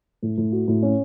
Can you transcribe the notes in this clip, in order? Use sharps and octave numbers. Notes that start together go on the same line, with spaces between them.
A2
A2
F#4
A2
C#4